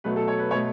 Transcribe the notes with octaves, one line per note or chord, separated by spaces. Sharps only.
B2 F#3 A3 B4
A4
C#5
B4
B2 A3 C#5